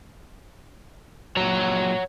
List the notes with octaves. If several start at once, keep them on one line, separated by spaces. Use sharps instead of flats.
A#2 F#3 C#5 F#5 A#5